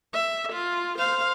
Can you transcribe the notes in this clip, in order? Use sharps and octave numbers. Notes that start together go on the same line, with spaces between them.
E5
F4
C5 F5